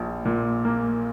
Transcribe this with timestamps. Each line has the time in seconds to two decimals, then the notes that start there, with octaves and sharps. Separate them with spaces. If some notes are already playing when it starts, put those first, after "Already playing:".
Already playing: A#1 F3
0.25 A#2
0.65 A#3